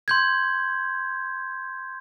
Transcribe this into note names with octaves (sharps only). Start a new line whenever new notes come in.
C6 G6 G#6